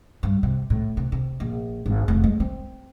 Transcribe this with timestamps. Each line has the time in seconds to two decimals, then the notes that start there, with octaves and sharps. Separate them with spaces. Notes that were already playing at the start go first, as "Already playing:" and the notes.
0.23 G2
0.43 C3
0.70 A2
0.97 C3
1.12 C3
1.40 A#1
1.86 G#1
2.08 F1
2.24 G#3
2.40 C4